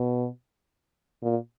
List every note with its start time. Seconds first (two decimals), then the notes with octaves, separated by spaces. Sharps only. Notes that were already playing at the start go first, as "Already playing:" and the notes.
Already playing: B2
1.23 A#2